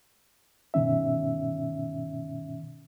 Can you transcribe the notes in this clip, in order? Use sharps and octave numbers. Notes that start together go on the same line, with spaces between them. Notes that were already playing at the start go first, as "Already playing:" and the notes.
G2 B2 D#3 C#4 E5